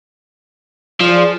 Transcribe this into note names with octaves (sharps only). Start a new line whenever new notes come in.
F3 G#4 D5